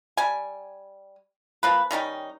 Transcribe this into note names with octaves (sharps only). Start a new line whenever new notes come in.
G3 G#5
F3 A#3 B4
D#3 G3 C#4 D#4